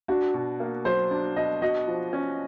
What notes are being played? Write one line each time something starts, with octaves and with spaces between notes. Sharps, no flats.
D4 F#4
B2
A#3
F#3 C5
D4
B2 D#5
F#4 D#5
F3
C#4